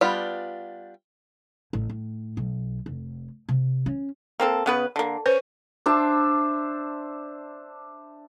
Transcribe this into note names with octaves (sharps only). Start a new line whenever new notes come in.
G3 B3 D4 F4
A1
A2
B1
F1
C3
C#4
A#3 C4 A4
C#3 B3 B4
D3 A#3
C#4 B4 C5
D4 C5 E5 A5